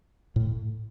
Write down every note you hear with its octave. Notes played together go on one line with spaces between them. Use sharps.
A2